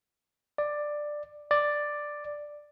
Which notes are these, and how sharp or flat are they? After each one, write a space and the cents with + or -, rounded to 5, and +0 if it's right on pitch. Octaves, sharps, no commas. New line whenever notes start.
D5 +10
D5 +5